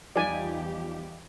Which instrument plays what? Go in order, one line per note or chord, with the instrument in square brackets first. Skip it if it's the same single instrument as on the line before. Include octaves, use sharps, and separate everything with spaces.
[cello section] E2 G4 [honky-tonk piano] F3 G3 D#4 [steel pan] D5 G#5